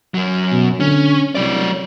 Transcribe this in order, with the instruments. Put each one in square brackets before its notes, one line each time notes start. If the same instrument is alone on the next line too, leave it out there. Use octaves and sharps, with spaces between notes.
[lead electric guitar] F#2 F#3
[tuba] B2
[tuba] D3 [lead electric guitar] C#4
[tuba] C2 [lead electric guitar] F#3 D5